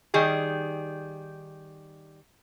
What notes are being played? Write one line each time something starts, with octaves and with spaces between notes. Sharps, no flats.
D#3 G3 G#4